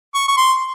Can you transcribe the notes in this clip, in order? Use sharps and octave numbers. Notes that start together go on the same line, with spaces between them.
C#6
C#6
C6